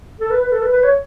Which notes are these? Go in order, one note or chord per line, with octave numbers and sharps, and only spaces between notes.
A4
B4
B4
A4
B4
B4
C#5